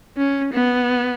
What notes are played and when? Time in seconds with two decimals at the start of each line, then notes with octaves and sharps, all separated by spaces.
0.18 C#4
0.53 B3